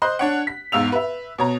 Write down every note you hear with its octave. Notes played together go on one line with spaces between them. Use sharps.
C5 D#5 C6 F#6
D4 C#5 F#5
B6
E2 G#2 F5 E6 F7
B4 E5
B2 C#5 A#5